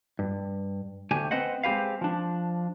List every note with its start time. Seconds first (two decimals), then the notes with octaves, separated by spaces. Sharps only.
0.19 G2
1.11 D2 A3 G4 G#5
1.31 C4 B4 C5 D#5 F#5
1.63 G#3 C4 G4 B4 F5
2.01 F3 D4